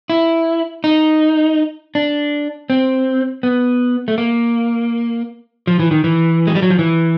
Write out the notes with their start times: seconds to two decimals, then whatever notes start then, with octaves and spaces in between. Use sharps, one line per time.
0.10 E4
0.84 D#4
1.95 D4
2.70 C4
3.43 B3
4.08 A3
4.18 A#3
5.67 F3
5.79 E3
5.91 D#3
6.04 E3
6.47 G#3
6.55 G3
6.62 F#3
6.70 F3
6.79 E3